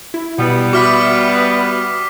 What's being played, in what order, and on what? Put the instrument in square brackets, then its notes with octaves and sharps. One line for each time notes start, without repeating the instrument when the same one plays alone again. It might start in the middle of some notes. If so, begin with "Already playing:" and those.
[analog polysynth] E4
[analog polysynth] B2 [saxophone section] G3 B3
[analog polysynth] F#4 E5 B5 [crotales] D6 F6 B6